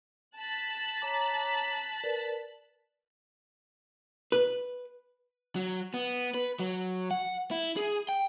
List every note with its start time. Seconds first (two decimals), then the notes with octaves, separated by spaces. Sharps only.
0.36 A5 F#6 B6
1.02 C#5 A#5 D6
2.04 A#4 B4 D5
4.32 B4
5.55 F#3
5.94 B3
6.34 B4
6.59 F#3
7.11 F#5
7.51 E4
7.76 G#4
8.09 G5